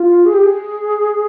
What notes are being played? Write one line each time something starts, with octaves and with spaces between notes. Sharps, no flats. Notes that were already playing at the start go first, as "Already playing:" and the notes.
Already playing: F4
G#4
G4
G#4